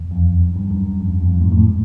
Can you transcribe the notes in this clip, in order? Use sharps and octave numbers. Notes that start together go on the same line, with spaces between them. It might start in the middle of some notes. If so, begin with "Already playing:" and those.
Already playing: E2
F2
F#2
G2
F#2
F2
E2
F2
F#2
G#2
A2